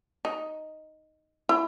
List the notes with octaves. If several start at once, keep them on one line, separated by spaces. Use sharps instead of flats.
D#4
E4